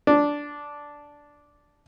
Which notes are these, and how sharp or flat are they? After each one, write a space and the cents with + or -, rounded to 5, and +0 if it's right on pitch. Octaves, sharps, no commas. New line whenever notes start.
D4 -5